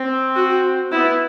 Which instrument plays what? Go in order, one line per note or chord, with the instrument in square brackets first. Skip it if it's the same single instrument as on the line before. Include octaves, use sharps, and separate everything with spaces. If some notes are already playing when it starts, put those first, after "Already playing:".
Already playing: [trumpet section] C4
[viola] F#4
[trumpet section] B3 [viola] E4